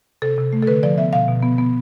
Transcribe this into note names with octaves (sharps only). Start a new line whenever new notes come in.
C3 A4
C3
A3
A4
D3 B4
F3 D5
B3 E5
B2 F5
B2
B3
B3